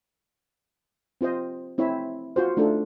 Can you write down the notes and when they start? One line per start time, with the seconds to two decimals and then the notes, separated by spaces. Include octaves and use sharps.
1.21 C4 F4 C5 D#5
1.78 C4 E4 C#5 E5
2.36 F4 F#4 C5
2.57 A3 D4 D#4 F4 A4